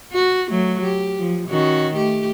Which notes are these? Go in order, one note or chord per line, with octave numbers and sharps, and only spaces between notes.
F#4
F#3 A3
G4
F3
D#3 C#4 F#4
A3 G4